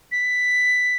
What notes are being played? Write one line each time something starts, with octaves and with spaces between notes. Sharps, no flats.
B6